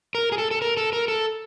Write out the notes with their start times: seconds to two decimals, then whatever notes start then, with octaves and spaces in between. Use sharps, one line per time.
0.15 A#4
0.32 G#4
0.38 A4
0.51 A4
0.62 A#4
0.77 A4
0.93 A#4
1.08 A4